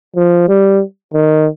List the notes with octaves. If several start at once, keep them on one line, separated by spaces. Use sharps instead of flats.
F3
G3
D#3